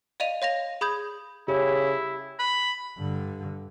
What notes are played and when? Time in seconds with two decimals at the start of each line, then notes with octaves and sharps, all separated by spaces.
0.20 D5 D#5 F5 D#7 F7
0.42 C#5 F5 A#6 F7
0.81 G#4 B5 D#6 G6 G#6
1.48 C#3 E4 G4
2.39 B5
2.98 G2 D3